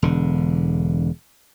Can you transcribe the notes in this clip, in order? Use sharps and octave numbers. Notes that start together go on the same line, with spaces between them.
E1 D3